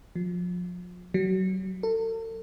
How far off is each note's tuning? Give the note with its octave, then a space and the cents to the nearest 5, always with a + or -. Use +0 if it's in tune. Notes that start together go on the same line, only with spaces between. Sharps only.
F3 +30
F#3 +25
A4 +40